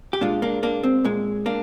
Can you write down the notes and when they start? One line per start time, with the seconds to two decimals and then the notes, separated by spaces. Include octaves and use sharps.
0.13 G4
0.21 A#2 G#3 D4 F4
0.42 A#3 D4
0.63 A#3 D4
0.83 C4
1.04 A#2 G#3
1.46 A#3 D4